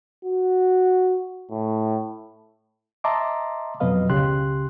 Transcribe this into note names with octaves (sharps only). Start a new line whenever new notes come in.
F#4
A2
D#5 E5 A5 A#5 C6 D6
F2 B2 F#3 B4 D#5 F5
C#2 C#3 G4 C6 F#6